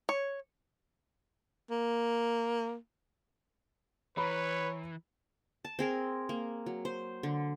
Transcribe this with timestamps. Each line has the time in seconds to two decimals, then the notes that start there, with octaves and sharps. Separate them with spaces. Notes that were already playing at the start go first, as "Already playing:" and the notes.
0.09 C#5
1.71 A#3
4.17 E3 B4 C#5 A#5 B5
5.65 A5
5.79 C4 G#4 A#4
6.29 A#3
6.66 F#3
6.85 C5
7.23 D3